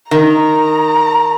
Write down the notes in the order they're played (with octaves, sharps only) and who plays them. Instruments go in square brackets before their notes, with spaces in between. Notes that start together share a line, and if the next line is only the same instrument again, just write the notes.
[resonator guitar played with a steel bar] D#3 [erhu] A#5